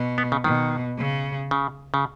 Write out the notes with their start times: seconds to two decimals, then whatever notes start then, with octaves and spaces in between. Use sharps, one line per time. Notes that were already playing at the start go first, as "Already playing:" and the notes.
Already playing: B2
0.18 B3
0.32 C#3
0.44 B2 D#3
0.98 C#3
1.51 C#3
1.94 C#3